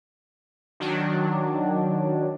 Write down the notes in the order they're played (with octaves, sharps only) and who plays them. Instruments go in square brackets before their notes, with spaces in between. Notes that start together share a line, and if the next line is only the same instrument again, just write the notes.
[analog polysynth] D#3 F#3 D4